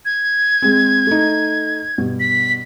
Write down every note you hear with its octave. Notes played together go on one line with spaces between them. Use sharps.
G#6
G#3 C4
A3 D#4
G2 B2
B6